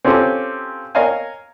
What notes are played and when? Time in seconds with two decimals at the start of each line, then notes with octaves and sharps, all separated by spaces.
0.05 C4 C#4 F4 G4 A4
0.95 A#4 C#5 D#5 F5 G#5